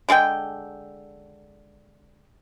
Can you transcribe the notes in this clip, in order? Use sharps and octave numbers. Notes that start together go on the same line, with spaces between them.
D3 G#3 G#4 G5